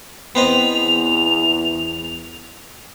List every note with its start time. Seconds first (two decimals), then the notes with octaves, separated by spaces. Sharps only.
0.35 E2 B3 C4 D#5 F7